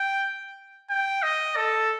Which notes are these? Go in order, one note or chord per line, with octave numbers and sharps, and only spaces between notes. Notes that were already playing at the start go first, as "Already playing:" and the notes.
Already playing: G5
G5
D#5
A4